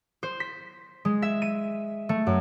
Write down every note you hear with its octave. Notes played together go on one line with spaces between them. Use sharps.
C5
B6
G#3
E5
D#7
A3
F#2